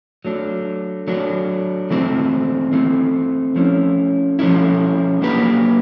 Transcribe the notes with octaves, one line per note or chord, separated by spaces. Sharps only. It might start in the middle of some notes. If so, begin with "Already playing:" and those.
F#3 A3 D4
F#3 A3 D4
E3 A3 C4
E3 A3 C4
F3 A3 C#4 E4
F3 A3 C#4 E4
F#3 A#3 D4 G4 B4